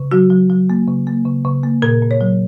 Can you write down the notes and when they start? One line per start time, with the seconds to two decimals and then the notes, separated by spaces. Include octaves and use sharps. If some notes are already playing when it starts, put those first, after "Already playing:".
Already playing: C#3
0.12 F#3 F#4
0.30 F#3
0.50 F#3
0.70 A#3
0.88 C#3
1.07 A#3
1.25 C#3
1.45 C#3
1.63 A#3
1.82 A#2 A#4
2.02 A#2
2.11 C#5
2.21 F#3